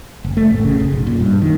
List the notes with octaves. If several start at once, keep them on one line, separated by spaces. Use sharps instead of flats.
F#1
A3
A1
C#3
F#1
B1
A#2
G2
D#3